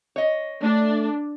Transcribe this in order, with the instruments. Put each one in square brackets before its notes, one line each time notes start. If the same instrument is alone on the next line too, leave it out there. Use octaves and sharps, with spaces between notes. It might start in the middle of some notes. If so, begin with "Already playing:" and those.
[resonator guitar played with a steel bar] C#5 D#5
[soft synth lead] A3 [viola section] D4